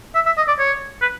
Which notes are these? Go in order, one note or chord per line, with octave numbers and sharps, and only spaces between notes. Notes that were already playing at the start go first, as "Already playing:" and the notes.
E5
E5
D#5
D5
C#5
B4